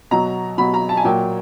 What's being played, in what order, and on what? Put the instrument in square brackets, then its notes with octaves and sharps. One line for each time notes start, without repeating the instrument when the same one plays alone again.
[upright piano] B2 F#3 A#5
B2 F#3 B5
A#5
A5
G#5
A#2 F#3 G5